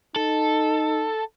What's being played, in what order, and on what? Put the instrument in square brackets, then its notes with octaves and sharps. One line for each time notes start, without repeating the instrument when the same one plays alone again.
[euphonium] D#4 [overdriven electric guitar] A4